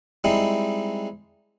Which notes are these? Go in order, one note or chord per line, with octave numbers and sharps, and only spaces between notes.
G3 G#3 C4 D#4 E4